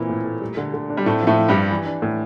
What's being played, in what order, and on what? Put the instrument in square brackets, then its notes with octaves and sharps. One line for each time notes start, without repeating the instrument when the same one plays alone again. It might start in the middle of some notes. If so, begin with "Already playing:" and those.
Already playing: [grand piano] A#2 A#3 [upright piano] E3 C4 E4
[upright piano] A2
A3
G3
D3
D3
D4
[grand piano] G3
[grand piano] A2 A3 [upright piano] C4
[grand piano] A2 A3 [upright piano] F3
[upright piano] F3
[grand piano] G2 G3
[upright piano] G4
E3
D4
A2